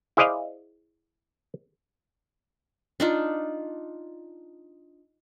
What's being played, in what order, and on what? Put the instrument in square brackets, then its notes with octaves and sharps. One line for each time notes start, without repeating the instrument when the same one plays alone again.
[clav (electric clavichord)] E4 G#4 C5 D5 D#5 F5
[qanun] D4 D#4 F4